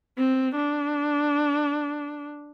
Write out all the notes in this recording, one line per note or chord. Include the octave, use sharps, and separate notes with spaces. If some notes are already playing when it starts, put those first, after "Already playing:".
C4
D4